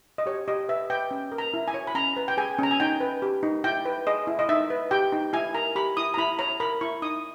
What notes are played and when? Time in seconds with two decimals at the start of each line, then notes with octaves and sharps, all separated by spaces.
0.18 D#5
0.26 G4 C#5
0.48 G4 D#5
0.68 B4 E5
0.90 B4 G5
1.11 C#4
1.32 A#4
1.38 A#5
1.54 E4
1.68 G#5
1.74 C#5
1.87 B5
1.95 C#4 A#5
2.16 B4
2.28 G5
2.37 G#4 G#5
2.58 C#4 A#5
2.71 G#5
2.80 D#4 G5
3.00 B4
3.22 G4
3.43 D#4
3.64 E4 G5
3.85 B4
4.07 G#4 D#5
4.27 E4
4.39 D#5
4.49 D#4 E5
4.70 B4
4.91 G4 G5
5.12 D#4
5.33 E4 G#5
5.54 A#4 A#5
5.75 G4 B5
5.97 E4 D#6
6.14 A#5
6.18 E4 B5
6.39 C#5 A#5
6.60 A#4 B5
6.81 E4 C#6
7.02 D#4 D#6